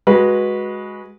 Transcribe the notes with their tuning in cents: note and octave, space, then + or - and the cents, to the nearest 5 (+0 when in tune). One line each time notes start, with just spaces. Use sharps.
G#3 +0 F#4 +0 B4 -15